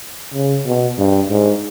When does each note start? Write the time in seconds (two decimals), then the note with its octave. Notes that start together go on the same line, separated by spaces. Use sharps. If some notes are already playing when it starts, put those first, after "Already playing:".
0.33 C#3
0.65 B2
0.98 G2
1.30 G#2